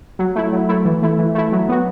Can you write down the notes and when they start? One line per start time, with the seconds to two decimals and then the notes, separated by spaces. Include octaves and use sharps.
0.19 F#3
0.36 A3 E4
0.52 F#3
0.69 A3 E4
0.85 E3
1.02 A3 E4
1.18 E3
1.35 A3 E4
1.52 F#3
1.69 B3 F#4